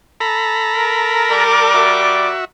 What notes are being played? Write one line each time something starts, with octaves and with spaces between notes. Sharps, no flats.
A4 A#5 B5
A#4
G3 D5 D6
F#4 E5